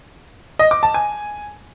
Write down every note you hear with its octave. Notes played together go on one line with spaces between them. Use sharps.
D#5
D6
A5
G#5